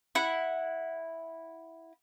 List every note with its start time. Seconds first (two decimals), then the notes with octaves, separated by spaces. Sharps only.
0.15 E4 F#5